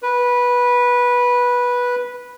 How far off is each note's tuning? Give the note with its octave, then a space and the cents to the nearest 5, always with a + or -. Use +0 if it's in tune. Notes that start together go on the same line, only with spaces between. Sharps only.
B4 -15